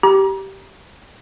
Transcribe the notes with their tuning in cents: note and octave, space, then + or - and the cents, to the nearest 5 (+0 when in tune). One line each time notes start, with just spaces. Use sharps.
G4 -15 A#5 +35